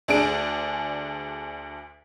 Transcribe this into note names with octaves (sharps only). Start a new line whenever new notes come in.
D2 D4 G#4 D7